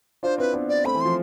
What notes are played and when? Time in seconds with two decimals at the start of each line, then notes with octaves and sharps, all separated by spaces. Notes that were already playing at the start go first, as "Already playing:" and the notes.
0.23 D4 F4 C5
0.38 C4 E4 B4
0.53 B3 D4
0.69 D5
0.85 A3 C4 B5
0.95 E3
1.01 F3 C6